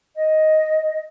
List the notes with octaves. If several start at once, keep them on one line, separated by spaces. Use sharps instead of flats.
D#5